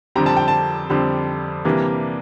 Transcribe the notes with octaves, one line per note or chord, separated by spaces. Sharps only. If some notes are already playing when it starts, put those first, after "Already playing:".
F2 D3 G3 C4 A#5
A5
G5
A5
F2 D3 G3 C4
C3 E3 G3 A#3 D4